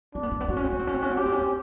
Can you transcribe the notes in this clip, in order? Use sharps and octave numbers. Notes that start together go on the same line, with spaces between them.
C4 D4
B3
A#3
B3
C4 F#4
C#4
C4
C#4
C4
C#4
C4
C#4
C4
C#4 G4
C4
C#4
C4